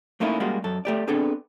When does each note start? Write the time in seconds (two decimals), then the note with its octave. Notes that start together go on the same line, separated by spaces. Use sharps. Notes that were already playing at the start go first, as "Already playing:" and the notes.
0.20 A3 A#3 C#4 D#4 E4
0.40 G3 G#3 A#3 C#4 F#4
0.64 F#2 A4
0.85 A3 G4 D5
1.07 B3 C4 D4 G#4 A4